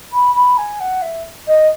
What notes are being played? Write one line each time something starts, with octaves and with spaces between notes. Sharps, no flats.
B5
B5
G#5
F#5
E5
D#5